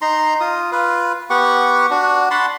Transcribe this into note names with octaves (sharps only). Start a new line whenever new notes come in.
D#4 A#5 C6
F4 D#6
F4 B4
B3 G4 F#5 C#6
D4 F#4
F#5 A5 B5 C6